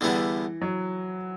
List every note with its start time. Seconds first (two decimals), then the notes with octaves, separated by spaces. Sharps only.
0.01 E2 D3 E3 G3 B3 E4
0.61 F#3